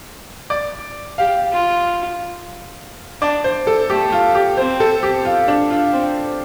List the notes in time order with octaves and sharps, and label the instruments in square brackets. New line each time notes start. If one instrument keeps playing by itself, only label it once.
[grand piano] D5
[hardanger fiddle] G4 [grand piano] F5
[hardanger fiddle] F4
[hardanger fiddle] D4 [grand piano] D5
[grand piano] C5
A4
[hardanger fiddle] A3 [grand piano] G4
[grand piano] F4
G4
[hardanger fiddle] C4 [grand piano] C5
[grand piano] A4
G4
F4
D4
F4
[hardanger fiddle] C4